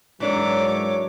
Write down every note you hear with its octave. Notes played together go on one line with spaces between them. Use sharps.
G#2 E3 F#3 D4 A#4 C#5 D6